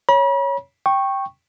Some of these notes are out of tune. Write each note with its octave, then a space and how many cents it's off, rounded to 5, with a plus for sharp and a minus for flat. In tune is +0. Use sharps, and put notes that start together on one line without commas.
C#5 +0 B5 -45
G5 +0 C#6 -15